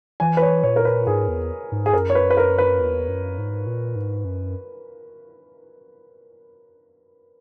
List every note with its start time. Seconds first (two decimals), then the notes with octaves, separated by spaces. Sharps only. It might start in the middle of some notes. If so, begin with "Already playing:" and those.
0.20 E3 G#5
0.37 B4
0.42 C#5
0.64 A#2 C#5
0.76 A#4
0.85 B4
1.07 G#2 G#4
1.28 E2
1.72 G#2
1.86 G#4
1.93 F#2 A#4
2.10 C#5
2.15 B4
2.30 B4
2.37 A#4
2.58 B4
2.80 E2
3.08 F#2
3.38 G#2
3.67 A#2
3.95 G#2
4.25 F#2